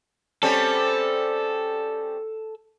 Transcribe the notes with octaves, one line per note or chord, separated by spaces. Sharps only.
G3 C4 C#4 A4